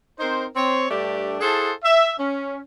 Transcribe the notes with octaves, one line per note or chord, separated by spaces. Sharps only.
C4 D#4 A#4 C5
C4 C#5 C6
G2 A3 D4 G4
E4 G#4 A4 C5 F#5 A5
E5
C#4